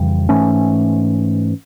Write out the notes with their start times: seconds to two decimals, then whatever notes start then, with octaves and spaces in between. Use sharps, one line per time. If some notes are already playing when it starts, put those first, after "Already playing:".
Already playing: F2 C#3 E3 G3
0.29 G#2 E3 A3 C#4